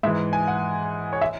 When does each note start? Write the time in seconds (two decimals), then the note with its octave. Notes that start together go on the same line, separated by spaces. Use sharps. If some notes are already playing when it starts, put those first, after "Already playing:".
0.03 G#2 E3 E5
0.33 G#5
0.48 F#5
1.13 C#5
1.21 E5